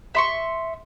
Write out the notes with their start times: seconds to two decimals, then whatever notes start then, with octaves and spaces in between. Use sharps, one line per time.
0.15 E5 C6 C#6